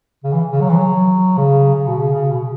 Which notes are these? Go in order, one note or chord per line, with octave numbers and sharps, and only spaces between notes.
C#3
E3
C#3
F#3
E3
F#3
C#3
C#3
B2
C#3
C#3
B2